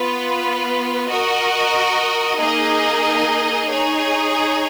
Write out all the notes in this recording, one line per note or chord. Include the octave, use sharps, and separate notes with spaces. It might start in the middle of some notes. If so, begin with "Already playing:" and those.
Already playing: B3 F4 B4
F#4 A#4 D#5
A#3 D#4 G#4 D#5
D#4 G#4 C#5